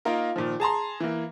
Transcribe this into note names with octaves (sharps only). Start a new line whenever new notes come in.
A#3 D#4 F4 A#4
A#2 D#3 F3
G#4 A5 A#5 C6
E3 A#3